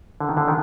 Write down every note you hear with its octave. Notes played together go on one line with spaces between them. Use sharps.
D3
D#3
D3
D#3